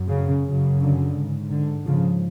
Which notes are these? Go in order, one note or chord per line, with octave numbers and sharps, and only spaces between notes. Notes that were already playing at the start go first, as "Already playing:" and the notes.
Already playing: F#2
C#3
F#2 C#3
D3
G#2
D3
G#2 C#3 F3